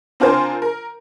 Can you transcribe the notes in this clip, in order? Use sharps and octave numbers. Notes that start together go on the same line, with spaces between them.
C4 D4 F4 A#4 C5 G#5
A#4